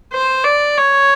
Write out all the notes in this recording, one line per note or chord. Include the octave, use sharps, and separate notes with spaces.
C5
D5
C#5